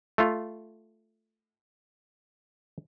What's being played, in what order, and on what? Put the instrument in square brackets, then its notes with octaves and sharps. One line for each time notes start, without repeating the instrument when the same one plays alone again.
[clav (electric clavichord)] A3 F4